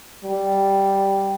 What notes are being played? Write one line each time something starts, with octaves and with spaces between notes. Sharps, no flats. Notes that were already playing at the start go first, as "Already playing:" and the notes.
G3